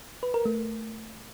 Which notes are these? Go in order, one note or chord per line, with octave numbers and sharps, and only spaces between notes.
B4
A#4
A3